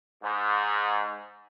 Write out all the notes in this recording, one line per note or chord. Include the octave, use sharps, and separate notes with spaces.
G#2